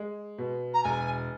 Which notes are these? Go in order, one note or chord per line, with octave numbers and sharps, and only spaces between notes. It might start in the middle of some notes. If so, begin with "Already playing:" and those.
Already playing: G#3
B2
A#5
E1 G#5